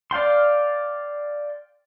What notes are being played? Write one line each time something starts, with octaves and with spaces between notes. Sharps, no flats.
D5 F5 G5 C6